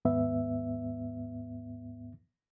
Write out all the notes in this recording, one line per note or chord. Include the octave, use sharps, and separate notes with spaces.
D#2 G#2 B3 E5